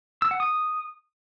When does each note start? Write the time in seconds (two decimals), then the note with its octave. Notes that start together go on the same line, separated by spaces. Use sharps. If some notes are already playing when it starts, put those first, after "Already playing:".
0.22 E6
0.31 F#5
0.40 D#6